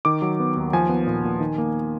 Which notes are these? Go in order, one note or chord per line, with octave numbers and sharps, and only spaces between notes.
D#3 D6
F#3
B3
D#2
F3 G#5
B3
A#2
A#2
D#3
A#3